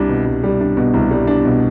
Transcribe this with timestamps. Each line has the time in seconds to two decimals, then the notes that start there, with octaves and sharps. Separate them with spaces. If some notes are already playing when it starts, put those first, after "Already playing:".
Already playing: C2 G3 D4
0.09 B2
0.26 C2
0.44 G3
0.61 D4
0.77 B2
0.94 C2
1.11 G3
1.27 D4
1.45 B2